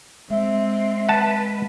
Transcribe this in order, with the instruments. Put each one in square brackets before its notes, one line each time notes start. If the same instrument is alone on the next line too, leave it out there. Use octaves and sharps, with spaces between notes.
[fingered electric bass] G#3 [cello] C4 [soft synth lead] E5
[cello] B4 [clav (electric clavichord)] F#5 A5